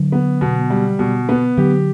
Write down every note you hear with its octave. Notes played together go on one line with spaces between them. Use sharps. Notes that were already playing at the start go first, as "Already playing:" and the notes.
Already playing: D3 F#3
B3
B2
G3
B2
B3
D3 F#3 G4